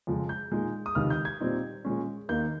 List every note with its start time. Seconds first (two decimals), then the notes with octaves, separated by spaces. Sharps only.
0.07 F2 C#3 F3 G#3
0.29 G6
0.51 A#2 G#3 D#4
0.86 D#6
0.95 C#2 C3 D#3 F6
1.10 G6
1.25 G#6
1.40 A#2 G3 C4 D#4
1.85 A#2 G#3 C#4
2.29 D#2 D#3 A#3 D#4 G6